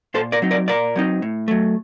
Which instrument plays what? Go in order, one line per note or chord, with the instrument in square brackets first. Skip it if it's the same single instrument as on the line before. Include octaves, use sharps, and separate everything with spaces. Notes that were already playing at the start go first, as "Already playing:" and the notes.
[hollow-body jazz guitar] A#2 A4 C5
A#4 D5
F#3 C4 D#4
A#4 D5
A#2 A#4 D5
F#3 C4 D#4
A2
F#3 A3